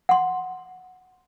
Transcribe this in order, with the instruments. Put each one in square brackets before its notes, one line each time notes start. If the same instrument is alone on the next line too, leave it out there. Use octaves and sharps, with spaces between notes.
[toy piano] F#5 C6